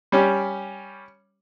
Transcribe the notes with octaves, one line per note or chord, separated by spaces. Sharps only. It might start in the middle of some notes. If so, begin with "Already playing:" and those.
G3 C#4 G4